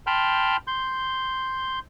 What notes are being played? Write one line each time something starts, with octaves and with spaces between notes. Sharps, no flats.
G5 A5 B5 C6 F6 G6
C6 G6